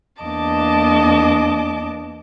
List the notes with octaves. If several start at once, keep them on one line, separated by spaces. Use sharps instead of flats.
E2 A#3 D4 D#5 A5 D6